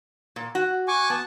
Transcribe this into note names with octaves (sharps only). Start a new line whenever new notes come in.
A#2
F#4
G#5 C#6 D6
B3 A5